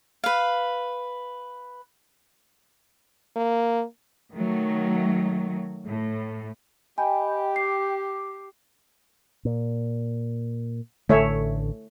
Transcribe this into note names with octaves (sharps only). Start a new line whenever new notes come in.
B4 F5
A#3
D#3 F#3 A3
A2
G4 D#5 G5 G#5 B5
D6 C7
A#2
A1 D3 A3 C#5 E5